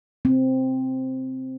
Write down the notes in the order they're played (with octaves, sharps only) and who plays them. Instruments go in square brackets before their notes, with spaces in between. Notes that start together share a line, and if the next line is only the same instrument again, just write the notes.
[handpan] C4